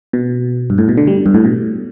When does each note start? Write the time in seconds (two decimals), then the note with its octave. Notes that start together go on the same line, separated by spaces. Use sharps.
0.13 B2
0.70 G2
0.78 A2
0.89 B2
0.97 D3
1.07 G3
1.26 G2
1.34 A2
1.45 B2